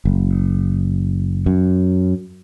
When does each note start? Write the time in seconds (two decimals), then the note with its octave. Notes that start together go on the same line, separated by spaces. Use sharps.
0.05 F#1
1.46 F#2